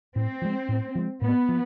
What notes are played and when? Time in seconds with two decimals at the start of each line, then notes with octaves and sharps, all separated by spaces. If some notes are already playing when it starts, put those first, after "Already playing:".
0.15 A2 C4
0.42 F3 G#3
0.69 A2
0.95 F3 G#3
1.22 A2 B3
1.49 F3